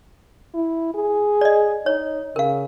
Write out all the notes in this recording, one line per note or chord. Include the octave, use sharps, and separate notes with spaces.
E4
G#4
D5 D#5
D#4 C#5
C#3 A#4 F5